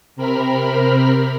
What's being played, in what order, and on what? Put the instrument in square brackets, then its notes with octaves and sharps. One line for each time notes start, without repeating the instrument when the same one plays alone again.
[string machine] C3 C4 A#4 B5 F6